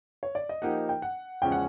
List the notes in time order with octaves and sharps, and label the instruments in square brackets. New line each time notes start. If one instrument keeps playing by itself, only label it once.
[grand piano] C#5
D5
D#5
[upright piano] F3 A#3 D#4 G4 [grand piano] F#5
[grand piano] G5
F#5
[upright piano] E2 C#3 F3 G#3 C#4 [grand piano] G5
[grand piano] F#5